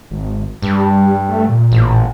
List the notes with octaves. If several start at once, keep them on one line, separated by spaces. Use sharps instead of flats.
G#1
G2 G3
A3
A#2
A1